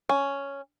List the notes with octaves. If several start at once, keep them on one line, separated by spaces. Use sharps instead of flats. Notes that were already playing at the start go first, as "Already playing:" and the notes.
C#4